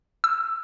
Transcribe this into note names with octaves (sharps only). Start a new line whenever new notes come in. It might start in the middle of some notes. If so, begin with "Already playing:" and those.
E6